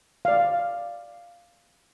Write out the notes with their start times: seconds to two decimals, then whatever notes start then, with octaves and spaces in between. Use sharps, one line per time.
0.25 D5 F5